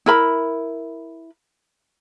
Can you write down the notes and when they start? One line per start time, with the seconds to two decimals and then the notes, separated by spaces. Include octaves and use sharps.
0.06 E4 A#4 B5